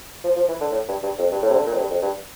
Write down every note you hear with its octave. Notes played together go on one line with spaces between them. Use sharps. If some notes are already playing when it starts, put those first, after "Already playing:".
F3
F3
E3
D3
A2
G2
G2
F2
G2
A2
C3
D3
A#2
F2
G2
F2
G2